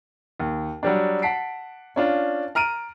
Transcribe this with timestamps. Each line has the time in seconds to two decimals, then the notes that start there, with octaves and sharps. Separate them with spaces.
0.40 D#2
0.83 F#3 G3 D4
1.22 F#5 A5 B6 C7 D7
1.96 C#4 D4 F4
2.55 A#5 F6 D7 D#7